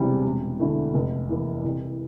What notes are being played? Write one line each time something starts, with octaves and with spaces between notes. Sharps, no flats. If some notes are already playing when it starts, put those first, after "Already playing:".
Already playing: E1 E2 C3 G3 C4
E1
D2 D3 A3 E4
F1
E2 E3 A#3 E4
C2